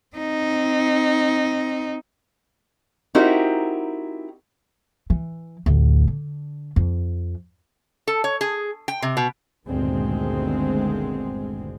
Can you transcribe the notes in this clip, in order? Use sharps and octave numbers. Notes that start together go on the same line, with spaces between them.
C4 D#4
C4 D#4 E4 F#4 G4 A#4
E3
A1 D2
D3
F2
A4
C#5
G#4
G5
C3
B2
G1 D2 A#2 D#3 G#3 C4